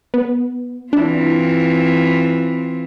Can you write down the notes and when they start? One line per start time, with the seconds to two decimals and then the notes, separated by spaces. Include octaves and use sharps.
0.14 B3
0.93 E3 C4 D4 E4 F4